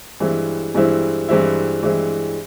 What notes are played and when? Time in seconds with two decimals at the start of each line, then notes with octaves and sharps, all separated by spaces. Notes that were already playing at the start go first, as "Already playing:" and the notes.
0.20 G2 E3 G#3 C4 E4
0.75 G2 E3 G#3 C4 E4
1.28 G2 E3 G#3 C4 E4
1.83 G2 E3 G#3 C4 E4